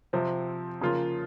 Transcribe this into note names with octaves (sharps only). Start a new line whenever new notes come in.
C3 F3 C4
C#3 F3 A#3 F4